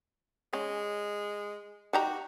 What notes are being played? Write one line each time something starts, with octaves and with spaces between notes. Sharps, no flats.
G#3 C#4
D#3 F#4 G4 A#5